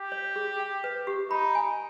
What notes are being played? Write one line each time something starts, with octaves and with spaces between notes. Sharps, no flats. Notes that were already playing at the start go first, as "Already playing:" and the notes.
Already playing: G4
C#5
G#4
G5
B4
G4
D#4 B5
G#5